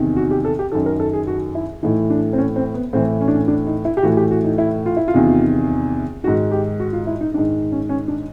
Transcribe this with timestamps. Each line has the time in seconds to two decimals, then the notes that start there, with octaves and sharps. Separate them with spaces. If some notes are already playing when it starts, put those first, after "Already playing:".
Already playing: E2 C3 D#3
0.17 F#4
0.31 G4
0.45 A4
0.59 G4
0.72 F#2 D#3 A4
0.86 A#4
1.00 A4
1.13 G#4
1.27 F#4
1.55 E4
1.83 A2 E3 D#4
2.10 D4
2.33 C4
2.38 C#4
2.56 C4
2.74 B3
2.93 A2 E3 C4
3.21 C#4
3.28 D4
3.35 C#4
3.48 D4
3.67 D#4
3.85 E4
3.97 G4
4.03 A2 E3 F#4
4.17 G4
4.31 F#4
4.44 D#4
4.58 E4
4.86 F4
4.97 E4
5.08 F4
5.14 E2 C3 D#3
6.24 D#3 F#4
6.27 G#2
6.51 G4
6.80 F#4
6.93 F4
7.07 E4
7.21 D#4
7.34 G#2 D#3 D4
7.72 C#4
7.89 C#4
8.08 D4